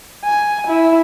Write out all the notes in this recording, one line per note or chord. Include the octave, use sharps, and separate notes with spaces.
G#5
E4